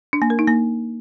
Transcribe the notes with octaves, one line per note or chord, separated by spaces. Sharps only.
D4
A#3
A#4
D#4
A#3